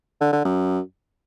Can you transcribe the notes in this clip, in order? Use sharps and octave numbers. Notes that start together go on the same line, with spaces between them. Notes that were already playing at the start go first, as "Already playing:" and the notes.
D3
D3
F#2